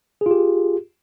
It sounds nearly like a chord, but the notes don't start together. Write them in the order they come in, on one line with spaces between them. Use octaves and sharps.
G#4 F4 G4